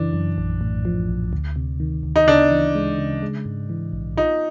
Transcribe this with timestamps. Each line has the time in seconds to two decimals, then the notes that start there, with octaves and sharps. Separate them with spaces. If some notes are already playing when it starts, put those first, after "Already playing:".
Already playing: F#2 C#3 E3 D4
0.13 F#2
0.38 A#1
0.61 A2
0.85 F3
1.08 A#1
1.33 D2
1.56 C3
1.80 D#3
2.03 D2
2.16 D#4
2.27 C#3 D4
2.51 E3
2.75 G#3
2.98 C#3
3.23 G#3
3.46 G#2
3.69 E3
3.93 A#1
4.17 D#4 F4